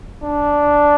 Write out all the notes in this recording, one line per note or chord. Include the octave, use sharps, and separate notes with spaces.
D4